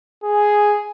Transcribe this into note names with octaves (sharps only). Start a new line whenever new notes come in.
G#4